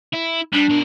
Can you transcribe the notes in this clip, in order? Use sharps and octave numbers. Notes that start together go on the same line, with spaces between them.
E4
G3 D4
B2 A#4